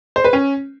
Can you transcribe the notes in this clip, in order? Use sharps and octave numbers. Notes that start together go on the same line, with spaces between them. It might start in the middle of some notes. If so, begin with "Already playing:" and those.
C5
B4
C#4